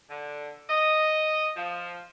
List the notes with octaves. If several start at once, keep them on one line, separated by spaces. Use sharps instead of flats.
D3
D#5
F3